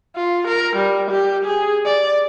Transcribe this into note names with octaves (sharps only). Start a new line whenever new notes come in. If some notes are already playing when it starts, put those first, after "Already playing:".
F4
A#4
G3
G4
G#4
D5